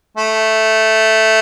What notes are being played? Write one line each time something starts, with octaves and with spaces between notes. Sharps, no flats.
A3